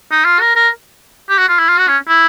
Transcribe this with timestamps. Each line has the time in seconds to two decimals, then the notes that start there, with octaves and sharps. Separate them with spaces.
0.11 D#4
0.25 F4
0.41 A#4
0.55 A#4
1.29 G4
1.38 F#4
1.48 F4
1.59 E4
1.69 F4
1.78 F#4
1.88 C#4
2.08 E4